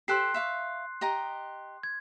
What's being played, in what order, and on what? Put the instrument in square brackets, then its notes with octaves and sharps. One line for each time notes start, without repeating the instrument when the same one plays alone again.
[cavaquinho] G4 A4 C5 [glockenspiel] C6 F#6 C7
[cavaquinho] E5 F5 C#6
G4 D#5 A#5
[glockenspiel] G#6